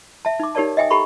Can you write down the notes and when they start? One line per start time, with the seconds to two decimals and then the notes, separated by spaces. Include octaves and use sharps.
0.25 E5 A5
0.40 D#4 D6
0.55 D#4 G4 A#4 C#5 D5 A5
0.77 D#5 E5 G5 G#5 D#6
0.90 G4 A4 A#5 B5 C#6